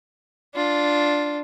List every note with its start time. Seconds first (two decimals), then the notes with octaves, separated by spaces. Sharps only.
0.55 D4 F4